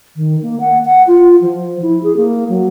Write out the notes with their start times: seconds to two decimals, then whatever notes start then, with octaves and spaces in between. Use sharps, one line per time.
0.16 D#3
0.43 A#3
0.60 F#5
0.85 F#5
1.07 F4
1.42 F3
1.82 E4
2.03 G#4
2.17 A#3
2.49 F#3